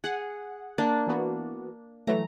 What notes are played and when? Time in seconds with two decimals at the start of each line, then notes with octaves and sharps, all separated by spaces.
0.04 G#4 F#5
0.78 A#3 D4
1.07 E3 B3 F#4
2.07 E3 F#3 A3 A#5